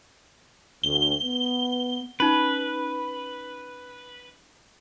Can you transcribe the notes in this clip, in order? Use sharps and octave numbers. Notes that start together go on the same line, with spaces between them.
D2 G7
B3
C#4 D#4 B4